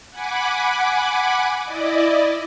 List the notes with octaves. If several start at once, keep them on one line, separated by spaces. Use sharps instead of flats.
F#5 G#5 B5 D6
E4 D5 D#5